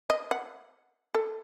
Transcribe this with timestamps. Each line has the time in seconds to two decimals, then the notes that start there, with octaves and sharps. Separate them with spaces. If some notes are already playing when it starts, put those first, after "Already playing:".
0.10 D#5
0.31 F#5
1.15 A4